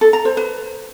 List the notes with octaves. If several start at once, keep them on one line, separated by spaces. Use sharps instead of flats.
A4
A#5
C5
B4